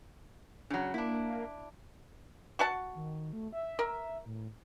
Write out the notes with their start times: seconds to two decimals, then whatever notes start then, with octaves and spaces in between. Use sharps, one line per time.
0.70 C#3 F#3 D4
0.94 A#3 D4 E4
2.59 F#4 F#5 A5
2.95 D#3
3.33 A3
3.53 E5
3.79 A#4
4.25 A2